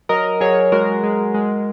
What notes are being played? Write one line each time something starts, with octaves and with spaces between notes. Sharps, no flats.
F#3 A#4 D#5
F#3 G#4 C#5
G#3 F#4 A#4
G#3
G#3